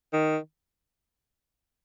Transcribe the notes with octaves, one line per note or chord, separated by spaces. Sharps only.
D#3